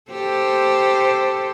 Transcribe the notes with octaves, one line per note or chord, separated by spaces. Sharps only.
G4 A4 C5